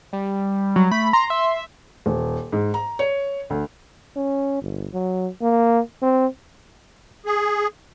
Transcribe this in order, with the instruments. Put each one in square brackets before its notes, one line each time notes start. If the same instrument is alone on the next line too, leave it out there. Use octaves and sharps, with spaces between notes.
[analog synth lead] G3
[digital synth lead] F#3
[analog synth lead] A3 [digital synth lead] B5
[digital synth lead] A#5 [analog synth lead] C6
[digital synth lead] E5
[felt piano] D#1
G#2
A#5
C#5
D2
[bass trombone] C#4
G1
F#3
A#3
C4
[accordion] G#4